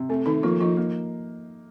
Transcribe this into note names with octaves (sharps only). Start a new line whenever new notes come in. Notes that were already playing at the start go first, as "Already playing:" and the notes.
Already playing: C3
A3 C4
D#3 A3 D#4
F3 A#3 F4
F3 D#4 F4
A#3